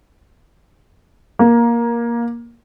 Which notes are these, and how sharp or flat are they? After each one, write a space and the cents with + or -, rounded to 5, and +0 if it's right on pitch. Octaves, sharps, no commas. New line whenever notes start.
A#3 +10